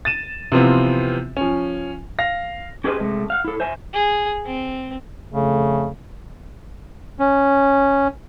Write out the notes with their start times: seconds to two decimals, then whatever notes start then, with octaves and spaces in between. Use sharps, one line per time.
0.05 A6 D#7 E7
0.52 C3 E3 F3 B3 C4 F4
1.37 F3 C#4
2.19 F5 A#6
2.84 C#4 G4 G#4 B4 C5 D#5
3.00 C3 G#3 A3
3.30 F5 F#5
3.44 E4 A4
3.60 C5 E5 G#5
3.93 G#4
4.45 C4
5.32 F2 C#3 A3
7.19 C#4